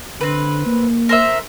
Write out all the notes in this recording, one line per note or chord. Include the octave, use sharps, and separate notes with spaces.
D3 C4 B4
A#3
A#4 C5 E5